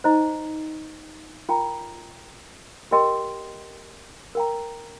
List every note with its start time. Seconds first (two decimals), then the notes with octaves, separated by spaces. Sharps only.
0.04 D#4 C5 D#5 A#5
1.49 F4 A#4 G5 A#5
2.91 G4 A#4 D#5 G5 C6
4.35 A#4 G5 A#5